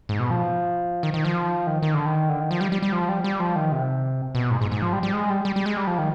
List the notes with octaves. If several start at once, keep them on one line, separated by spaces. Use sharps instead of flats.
G#2
B2
F3
D#3
D#3
F3
D#3
D#3
D3
D#3
D3
D#3
F3
G3
G3
G3
F3
G3
G3
F3
D#3
C3
B2
G#2
G#2
G#2
F3
G3
G3
G#3
G3
G3
G3
G#3
G3
F3
D#3